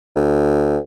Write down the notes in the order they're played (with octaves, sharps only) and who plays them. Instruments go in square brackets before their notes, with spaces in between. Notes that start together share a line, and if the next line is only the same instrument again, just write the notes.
[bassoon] D2